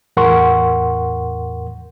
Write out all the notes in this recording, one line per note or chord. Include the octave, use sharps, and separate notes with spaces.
E2 A2 A#4 F#5 C6 C#6